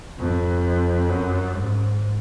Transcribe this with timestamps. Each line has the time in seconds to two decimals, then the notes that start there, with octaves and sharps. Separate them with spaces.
0.19 F2
1.10 F#2
1.55 G#2